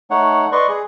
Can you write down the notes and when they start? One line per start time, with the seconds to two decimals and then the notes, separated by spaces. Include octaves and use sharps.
0.11 A3 D#4 C#5 F#5
0.52 B4 D5 D#5 C6 C#6
0.69 G#4